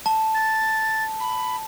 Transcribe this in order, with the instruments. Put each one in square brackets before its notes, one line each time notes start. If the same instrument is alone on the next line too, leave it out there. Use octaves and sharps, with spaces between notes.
[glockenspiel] A5
[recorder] A6
B5